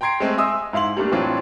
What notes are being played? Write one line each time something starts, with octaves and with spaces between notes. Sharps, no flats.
G5 A#5 C6 G#6 C7 D7
G#3 A3 C4
D#5 E5 G#5 C6 D#6 E6
G#2 E4 F5 C6 F#7
G3 A3 A#3 D4
A2 E3 F#3 C4 D4 F4